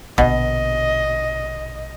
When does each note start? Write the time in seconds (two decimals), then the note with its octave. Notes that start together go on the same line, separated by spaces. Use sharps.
0.18 A#1 B2 D3 D#5